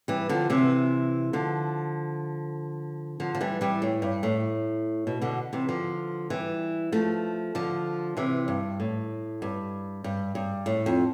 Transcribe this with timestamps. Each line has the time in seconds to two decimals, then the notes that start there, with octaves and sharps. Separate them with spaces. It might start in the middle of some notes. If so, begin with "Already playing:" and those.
0.08 E3 G3
0.29 D3 F3
0.50 C3 E3
1.33 D3 F3
3.20 D3 F3
3.35 F3
3.41 E3 G3
3.61 E3 G3
3.82 A2
4.02 G2
4.23 A2
5.07 B2
5.21 B2 D3
5.53 C3 E3
5.68 D3 F3
6.30 E3 G3
6.92 F3 A3
7.55 D3 F3
8.17 C3 E3
8.48 G2
8.80 A2
9.42 G2
10.04 G2
10.35 G2
10.66 A2
10.86 F2